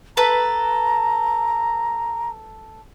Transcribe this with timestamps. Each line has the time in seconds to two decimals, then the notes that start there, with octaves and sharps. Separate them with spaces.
0.17 A4 B4 A#5